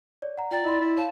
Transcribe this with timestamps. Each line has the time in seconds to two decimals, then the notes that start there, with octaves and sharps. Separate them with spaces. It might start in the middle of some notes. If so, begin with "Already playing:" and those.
0.22 C#5 D5
0.38 F#5 A#5
0.51 F4 D5 G5 A#5
0.64 E4 D#5 B5 C6
0.81 E4
0.97 C#5 F5 A5